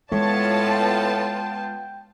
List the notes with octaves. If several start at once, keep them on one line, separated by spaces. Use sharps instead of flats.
A2 G#3 B3 F4 C#5 A5
G5